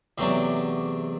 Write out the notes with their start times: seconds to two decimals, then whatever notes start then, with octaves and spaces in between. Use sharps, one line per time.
0.18 E2 C3 F#3 A3 D4